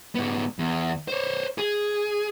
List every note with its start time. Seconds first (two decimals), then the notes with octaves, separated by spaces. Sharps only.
0.15 G#2 B3
0.59 E2
1.08 C5 C#5
1.58 G#4